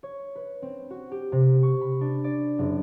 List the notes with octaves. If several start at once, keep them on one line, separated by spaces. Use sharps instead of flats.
C#5
B4
C4
F#4
G4
C3
C#6
B5
D4
D5
F#1